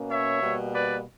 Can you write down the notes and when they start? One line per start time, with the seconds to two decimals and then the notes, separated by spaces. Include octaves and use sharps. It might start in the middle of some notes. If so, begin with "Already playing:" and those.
Already playing: B2 A#3 C#4
0.09 C#5 E5
0.41 B2 G3 A#3
0.73 B4 D5